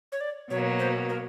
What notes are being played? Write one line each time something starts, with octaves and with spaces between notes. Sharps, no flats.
C#5
D5
B2 F#3 A#3 C#5
C5
A#4